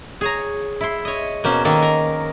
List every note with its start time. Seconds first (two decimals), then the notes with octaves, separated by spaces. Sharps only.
0.21 G#4 C#5 A#5
0.81 E4 C6
1.05 C#5 D#5
1.44 B2 A#3 C#4 C5
1.65 D#3 A#3 A4
1.82 A#4